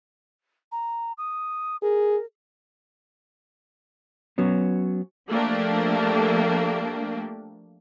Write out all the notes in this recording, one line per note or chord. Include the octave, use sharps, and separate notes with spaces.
A#5
D#6
G#4 A#4
F#3 B3 C#4
F3 A3 A#3 D4 G4